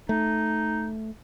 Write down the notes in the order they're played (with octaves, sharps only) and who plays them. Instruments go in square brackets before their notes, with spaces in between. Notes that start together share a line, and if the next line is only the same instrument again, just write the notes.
[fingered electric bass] A3 [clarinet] D#4